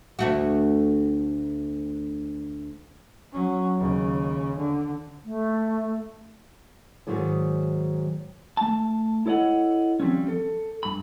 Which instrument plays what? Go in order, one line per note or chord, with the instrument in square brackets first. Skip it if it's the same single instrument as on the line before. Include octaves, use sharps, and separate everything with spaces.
[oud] D2 A3 F#4
[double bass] F#3 C#4
D#2 C#3
D3
[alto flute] A3
[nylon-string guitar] G#2 D#3 F#3 G#4 D5
[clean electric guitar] A3 A5
E4 A4 C#5 D#5 F#5
F3 G3 C4 C#4
A4
G2 B5